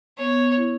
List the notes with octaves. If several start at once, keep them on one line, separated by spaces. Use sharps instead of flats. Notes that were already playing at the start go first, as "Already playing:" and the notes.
B3 C#5
E4